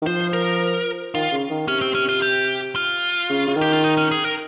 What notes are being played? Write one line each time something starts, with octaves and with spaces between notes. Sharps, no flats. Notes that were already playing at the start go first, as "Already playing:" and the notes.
D#3
F3 C5
A#4
D#3 F4
C#3
D#3
C3 C#4
C4
C#4
F4
G4
F4
C#3
C#3
D#3 G4
F4
D#4
C#4
G#4
A#4